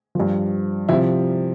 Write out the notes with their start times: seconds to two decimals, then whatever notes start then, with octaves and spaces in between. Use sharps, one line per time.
0.15 G2 F3
0.89 C3 F3 E4